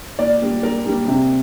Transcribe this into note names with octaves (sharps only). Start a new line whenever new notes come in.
A#2 D5
G3 A#3
A#2 A#4
G3 A#3
C3